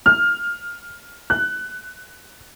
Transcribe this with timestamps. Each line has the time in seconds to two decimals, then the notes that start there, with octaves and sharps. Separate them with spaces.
0.06 F6
1.30 F#6